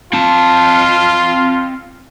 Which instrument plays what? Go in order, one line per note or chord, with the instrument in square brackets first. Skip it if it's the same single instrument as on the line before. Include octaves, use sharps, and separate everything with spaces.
[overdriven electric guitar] C4 A5 [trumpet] F4